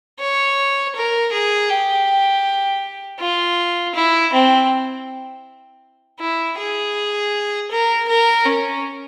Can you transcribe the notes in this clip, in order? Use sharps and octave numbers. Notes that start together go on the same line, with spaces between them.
C#5
A#4
G#4
G4
F4
E4
C4
E4
G#4
A#4
A#4
C#4